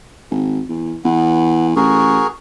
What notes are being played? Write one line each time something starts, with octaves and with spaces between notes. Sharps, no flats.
G#1
E2
E2 B3
A1 F#4 G#4 A#4